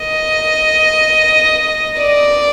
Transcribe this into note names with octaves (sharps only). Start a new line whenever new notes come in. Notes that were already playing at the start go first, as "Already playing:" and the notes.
Already playing: D#5
D5